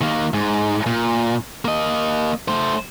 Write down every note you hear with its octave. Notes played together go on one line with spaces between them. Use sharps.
D#3 A#3
G#2
A#2
A#3 D#5
A3 C5